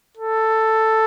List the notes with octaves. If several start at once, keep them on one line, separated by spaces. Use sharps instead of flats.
A4